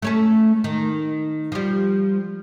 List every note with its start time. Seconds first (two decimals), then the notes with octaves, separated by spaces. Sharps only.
0.02 A3 C#4 A4
0.64 D#3
1.52 F3 G3